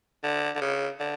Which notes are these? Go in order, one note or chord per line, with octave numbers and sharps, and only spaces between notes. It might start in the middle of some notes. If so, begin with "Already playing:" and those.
D3
D3
C#3
D3